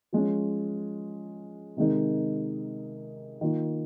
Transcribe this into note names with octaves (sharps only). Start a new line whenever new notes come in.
F3 G#3 C#4
C3 D#3 G#3 D#4 A#4
D#3 A#3 F4